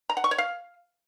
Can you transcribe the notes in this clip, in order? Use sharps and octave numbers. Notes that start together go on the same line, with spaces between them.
A#5
F#5
C#6
C#5
F5